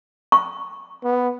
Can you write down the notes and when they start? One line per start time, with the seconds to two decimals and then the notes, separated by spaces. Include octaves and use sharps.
0.32 C#6
1.04 B3